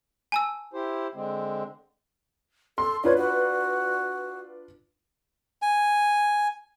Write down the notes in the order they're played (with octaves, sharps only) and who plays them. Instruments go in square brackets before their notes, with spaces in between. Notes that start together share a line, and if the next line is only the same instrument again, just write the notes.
[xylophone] G#5 A5 E6
[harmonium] E4 G4 C5
D3 G#3 C4
[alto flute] A4 [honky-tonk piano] C6
[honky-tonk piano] D4 F4 B4 [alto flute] C#5
[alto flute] F#4
[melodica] G#5